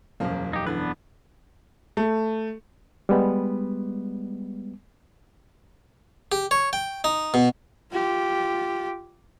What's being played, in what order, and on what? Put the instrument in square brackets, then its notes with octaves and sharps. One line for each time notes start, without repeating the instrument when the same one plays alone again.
[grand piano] E1 F#2 [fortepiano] C#3 F3 A#3
[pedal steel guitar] D#4 G4
[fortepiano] D3 E3 [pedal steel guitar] B3 D4 B4
[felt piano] A3
[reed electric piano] G3 G#3 B3
[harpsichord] G4
C#5
G5
D#4
B2
[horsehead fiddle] F4 G4